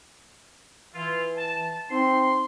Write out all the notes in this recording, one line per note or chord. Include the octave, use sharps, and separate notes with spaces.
E3 E4 F4
A5
C4 D#4 C6